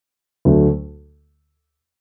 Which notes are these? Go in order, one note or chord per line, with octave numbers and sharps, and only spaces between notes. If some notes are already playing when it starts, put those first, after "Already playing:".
D2 D3 F#3 A3